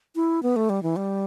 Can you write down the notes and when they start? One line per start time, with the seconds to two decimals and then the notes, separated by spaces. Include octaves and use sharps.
0.15 E4
0.43 B3
0.56 A3
0.70 G3
0.83 E3
0.96 G3